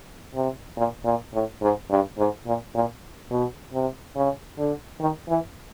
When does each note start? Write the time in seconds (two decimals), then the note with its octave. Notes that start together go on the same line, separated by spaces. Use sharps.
0.35 C3
0.77 A#2
1.05 A#2
1.34 A2
1.62 G#2
1.91 G2
2.18 G#2
2.46 A#2
2.75 A#2
3.31 B2
3.73 C3
4.15 C#3
4.58 D3
5.00 D#3
5.28 E3